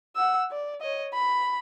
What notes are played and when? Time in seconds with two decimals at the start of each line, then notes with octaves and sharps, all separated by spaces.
0.16 F#5 E6
0.51 D5
0.81 C#5 D#5
1.14 B5